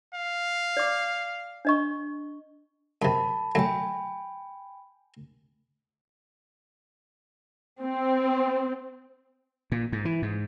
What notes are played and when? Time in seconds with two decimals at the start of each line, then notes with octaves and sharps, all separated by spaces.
0.14 F5
0.77 D5 D6
1.65 D4 D#5 C#6
3.02 F#2 C3 A5 B5
3.55 F#3 A3 G5 G#5 B5
7.83 C4
9.72 A#2
9.92 G#2
10.05 E3
10.22 G#2